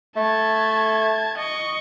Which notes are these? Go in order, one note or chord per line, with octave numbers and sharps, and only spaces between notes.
A3 A5 G#6
D#5 C#6